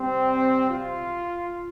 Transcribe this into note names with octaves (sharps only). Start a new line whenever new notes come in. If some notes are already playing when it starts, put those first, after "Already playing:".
Already playing: C3 G3 C4
F4